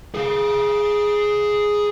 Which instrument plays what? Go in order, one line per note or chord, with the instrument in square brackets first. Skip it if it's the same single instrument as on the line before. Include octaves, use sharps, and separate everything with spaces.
[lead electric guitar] G#4 F5